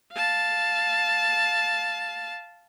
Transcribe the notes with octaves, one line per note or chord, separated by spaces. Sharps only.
F5 A5